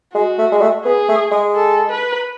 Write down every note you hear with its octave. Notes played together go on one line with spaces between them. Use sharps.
G#3 F#4
A3
G#3
A3
B3 G#4
A3
G#3
A4
B4